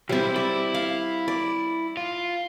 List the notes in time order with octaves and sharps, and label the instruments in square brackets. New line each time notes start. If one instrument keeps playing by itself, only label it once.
[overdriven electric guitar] B1 E4 [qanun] G3 C4
[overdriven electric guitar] E4 [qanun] D5
[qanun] F5
D5
[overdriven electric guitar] F4